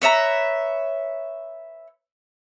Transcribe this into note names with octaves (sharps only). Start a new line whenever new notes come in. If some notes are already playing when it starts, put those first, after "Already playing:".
B4 C#5 E5 A#5